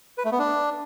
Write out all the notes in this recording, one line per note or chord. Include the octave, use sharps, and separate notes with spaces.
B4
A3
B3
D4